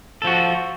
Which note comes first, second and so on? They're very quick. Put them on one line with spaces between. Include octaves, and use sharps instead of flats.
A4 F3 F#4